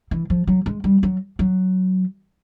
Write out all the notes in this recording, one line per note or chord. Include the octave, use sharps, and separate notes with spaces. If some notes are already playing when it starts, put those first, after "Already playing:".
E3
F3
F#3
G#3
G3
F#3
F#3